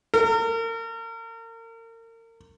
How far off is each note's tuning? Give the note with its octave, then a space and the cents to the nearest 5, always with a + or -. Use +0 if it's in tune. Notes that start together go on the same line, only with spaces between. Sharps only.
A#4 -35